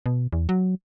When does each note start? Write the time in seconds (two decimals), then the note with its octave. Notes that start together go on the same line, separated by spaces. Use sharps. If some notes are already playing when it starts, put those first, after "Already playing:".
0.06 B2
0.33 E2
0.49 F#3